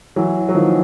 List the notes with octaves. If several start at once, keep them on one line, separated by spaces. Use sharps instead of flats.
E3 F#3
F#3
D#3 F3